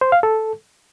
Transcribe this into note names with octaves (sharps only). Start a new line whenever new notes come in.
C5
F5
A4